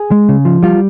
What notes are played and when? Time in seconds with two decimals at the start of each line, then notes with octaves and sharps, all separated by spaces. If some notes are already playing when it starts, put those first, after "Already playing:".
Already playing: G#4
0.11 G#3
0.29 C#3
0.45 F3
0.63 G3 F4